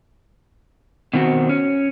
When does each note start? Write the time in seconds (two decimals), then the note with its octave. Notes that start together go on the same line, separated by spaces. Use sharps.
1.13 B2 D#3 C4 D#4 F#4
1.49 C#4